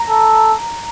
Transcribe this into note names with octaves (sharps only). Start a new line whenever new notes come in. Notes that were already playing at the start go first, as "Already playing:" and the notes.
Already playing: A#5
A4